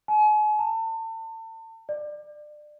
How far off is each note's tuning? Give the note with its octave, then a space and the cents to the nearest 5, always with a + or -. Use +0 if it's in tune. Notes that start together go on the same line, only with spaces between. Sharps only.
G#5 +40
A5 +35
D5 +25